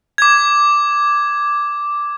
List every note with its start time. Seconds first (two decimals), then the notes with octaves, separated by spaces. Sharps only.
0.18 D6 G#6